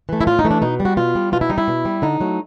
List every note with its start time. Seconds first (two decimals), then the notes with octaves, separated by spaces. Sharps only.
0.09 E3 A3
0.21 E4
0.27 A2 F4
0.39 D#4
0.45 E3 A3
0.51 D4
0.62 B2 D#4
0.80 G3
0.85 F#4
0.97 B2 F4
1.15 G3
1.32 B2 F4
1.41 E4
1.50 G3 D#4
1.58 E4
1.68 B2
1.85 G3
2.02 D3 D#4
2.20 F#3 A3